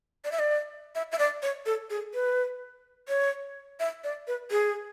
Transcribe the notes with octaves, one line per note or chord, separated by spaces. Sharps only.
D5
E5
D5
E5
E5
D5
C#5
A4
G#4
B4
C#5
E5
D5
B4
G#4